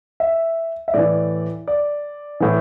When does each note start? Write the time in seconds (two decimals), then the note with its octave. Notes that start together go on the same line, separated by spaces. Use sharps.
0.20 E5
0.88 E5
0.94 A2 E3 D5
1.68 D5
2.40 A2 E3